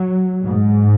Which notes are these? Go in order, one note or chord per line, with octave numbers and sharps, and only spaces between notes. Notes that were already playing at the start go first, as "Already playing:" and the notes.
Already playing: F#3
G#2